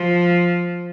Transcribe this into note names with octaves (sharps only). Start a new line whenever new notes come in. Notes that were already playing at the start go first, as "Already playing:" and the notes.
Already playing: F3